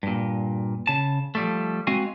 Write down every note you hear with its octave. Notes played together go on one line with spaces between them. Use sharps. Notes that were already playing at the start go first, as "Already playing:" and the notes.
G2 A#2
C#3 A5
F3 G3 A3
G#3 C4 F#4 F5 G#5